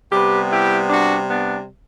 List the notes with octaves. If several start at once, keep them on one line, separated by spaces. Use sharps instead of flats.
C3 G3 B3 G4 B4
E4 G4
D4 F#4
B3 D4